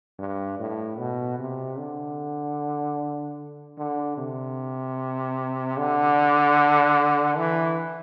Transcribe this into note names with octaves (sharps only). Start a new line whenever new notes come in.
G2
A2
B2
C3
D3
D3
C3
D3
E3